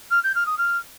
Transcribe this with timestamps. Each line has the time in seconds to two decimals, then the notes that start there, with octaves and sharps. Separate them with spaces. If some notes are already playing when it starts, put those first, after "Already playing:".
0.10 F6
0.23 G6
0.35 F6
0.46 D#6
0.58 F6